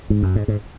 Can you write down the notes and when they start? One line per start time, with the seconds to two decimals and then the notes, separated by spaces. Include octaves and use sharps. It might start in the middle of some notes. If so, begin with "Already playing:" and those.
0.10 G#2
0.23 F#2
0.36 G#2
0.48 G#2